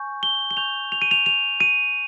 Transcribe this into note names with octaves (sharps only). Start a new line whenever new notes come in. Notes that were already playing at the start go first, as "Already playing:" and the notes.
Already playing: G#5 C#6 G6
G7
G7
G#5 C#6 G6 F7
F7
D#7
F7
F7
D#7